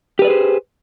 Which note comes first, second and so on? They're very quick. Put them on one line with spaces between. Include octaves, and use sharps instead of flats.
G4 B4 D5 G#4 C5